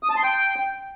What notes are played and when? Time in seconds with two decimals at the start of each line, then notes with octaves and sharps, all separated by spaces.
0.03 D#6
0.10 A5
0.17 C6
0.23 G5